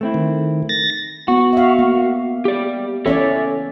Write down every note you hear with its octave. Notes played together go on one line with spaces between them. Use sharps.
A3 C4 E4
D#3
A6 A#6
B3 F#4
E5 F5
A#3
G4 D5
E3 C#4 A4 C#5 D5 E5